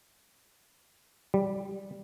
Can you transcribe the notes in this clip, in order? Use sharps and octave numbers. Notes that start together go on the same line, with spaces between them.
G3